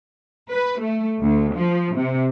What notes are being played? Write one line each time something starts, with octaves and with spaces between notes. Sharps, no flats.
B4
A3
D2
F3
C3